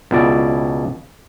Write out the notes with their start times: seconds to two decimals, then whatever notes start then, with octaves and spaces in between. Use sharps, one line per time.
0.11 C#2 B2 E4 D5